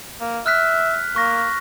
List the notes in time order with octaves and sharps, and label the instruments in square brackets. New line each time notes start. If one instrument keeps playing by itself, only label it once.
[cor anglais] A#3
[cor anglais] E5 [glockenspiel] F6 F#6 B6
[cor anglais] A#3 [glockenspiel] C#6 A#6